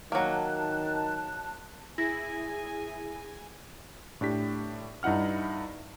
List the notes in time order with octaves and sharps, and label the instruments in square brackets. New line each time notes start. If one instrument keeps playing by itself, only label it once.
[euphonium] D#3 [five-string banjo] F#3 A#3 [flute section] A5 F#6
[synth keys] E4 [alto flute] G#4 [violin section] G#5 [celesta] A#6
[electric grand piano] A2 D4 G4 B6
G2 D#4 E4 F#5 F6